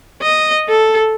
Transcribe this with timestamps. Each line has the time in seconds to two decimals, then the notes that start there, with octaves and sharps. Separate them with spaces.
0.22 D#5
0.69 A4